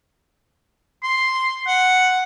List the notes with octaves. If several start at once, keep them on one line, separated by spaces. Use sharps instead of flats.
C6
F#5